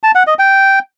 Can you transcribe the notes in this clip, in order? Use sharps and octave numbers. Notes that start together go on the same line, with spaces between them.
A5
F#5
D#5
G5